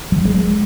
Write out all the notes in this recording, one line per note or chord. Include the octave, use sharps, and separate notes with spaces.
F#3
G#3